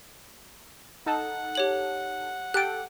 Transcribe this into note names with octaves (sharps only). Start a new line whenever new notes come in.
D#4 A4 F#5 A5
G4 C#5 F#7
G4 A4 G5 F#6 D7